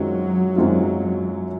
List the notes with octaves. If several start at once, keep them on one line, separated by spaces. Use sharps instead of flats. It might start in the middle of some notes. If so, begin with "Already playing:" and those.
Already playing: F#2 D#3 F#3 G#3 C4 F4
F#2 D#3 G#3 C4 F4